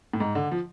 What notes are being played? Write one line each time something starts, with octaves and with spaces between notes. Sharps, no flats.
A2
G#2
D3
F3